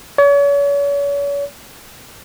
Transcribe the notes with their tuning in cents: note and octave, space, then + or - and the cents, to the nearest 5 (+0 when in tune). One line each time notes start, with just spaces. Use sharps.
C#5 +40